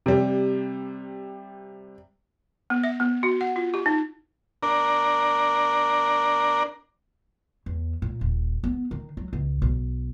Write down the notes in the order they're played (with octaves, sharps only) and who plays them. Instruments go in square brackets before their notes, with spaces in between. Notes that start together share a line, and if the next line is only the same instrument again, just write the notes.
[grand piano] C3 G3
[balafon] B3
E5
B3
F#4
F#5
F4
G4
D#4
[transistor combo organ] D4 A#4
[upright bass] E2
A#2
D#1
B3
D#3
F#3
C#2
B1